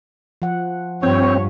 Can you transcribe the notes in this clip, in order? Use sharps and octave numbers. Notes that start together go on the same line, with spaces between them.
F3 F#5
G2 F3 C4 C#5